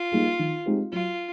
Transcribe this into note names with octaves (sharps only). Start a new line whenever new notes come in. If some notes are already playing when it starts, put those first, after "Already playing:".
Already playing: F4
G3 A#3 D#4 G#4
D#3
G#3 C4 D#4 G4
F#3 F4